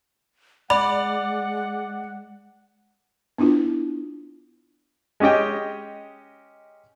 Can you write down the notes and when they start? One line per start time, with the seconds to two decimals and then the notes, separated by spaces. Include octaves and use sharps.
0.70 G#3 D5 F#5 B5
3.38 B3 D4 E4 F4 A#4
5.20 G#3 C#4 G4 D#5 G5